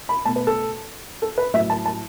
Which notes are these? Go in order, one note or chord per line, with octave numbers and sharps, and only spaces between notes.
B5
B2 A3 A5
B4
A4
A4
B4
A2 F#3 A3 E5
A5
A5